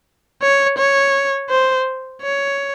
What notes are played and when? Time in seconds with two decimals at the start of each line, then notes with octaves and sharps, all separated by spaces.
0.42 C#5
0.78 C#5
1.50 C5
2.22 C#5